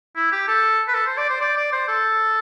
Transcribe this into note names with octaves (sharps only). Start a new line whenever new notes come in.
E4
G4
A4
B4
A4
C5
D5
C5
D5
D5
C5
A4